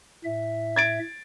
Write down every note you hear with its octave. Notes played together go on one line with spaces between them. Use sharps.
A2 E5
G#6 A6 D7